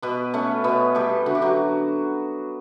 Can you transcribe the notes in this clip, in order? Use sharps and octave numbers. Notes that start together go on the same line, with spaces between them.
B2 B3 B4
A3 C#4 C#5
B2 B3 B4
G3 A3 G4
D3 F#4
G4
F#3 F#4